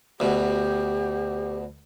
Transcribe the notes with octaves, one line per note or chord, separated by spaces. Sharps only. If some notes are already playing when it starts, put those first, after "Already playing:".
D2 B2 G4